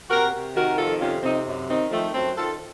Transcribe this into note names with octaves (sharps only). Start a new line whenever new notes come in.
C3 F#4 A#4
C3
D#3 F#4 A#4
F2 F4 A4
C3 C#4 F4
C3 C4 D#4
F#2
D#3 C4 D#4
D#3 F3 A3
F#2 A3 C4
D#3 F4 A4